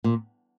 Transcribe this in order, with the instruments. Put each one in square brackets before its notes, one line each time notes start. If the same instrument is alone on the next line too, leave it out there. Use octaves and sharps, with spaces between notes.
[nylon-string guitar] A#2